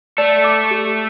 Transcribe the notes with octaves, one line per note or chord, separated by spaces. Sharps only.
A3 A4 D5
D6
G4